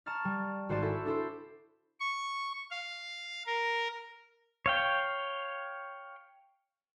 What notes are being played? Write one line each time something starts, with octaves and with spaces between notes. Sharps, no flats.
A5 A#5 C#6 F6 A6
G3
G#1 F#4 C5 D5 G#5 A5
E4 A4 E5 A5
D4 E4 A4 C5
C#6
F5
A#4
C#5 F5 G5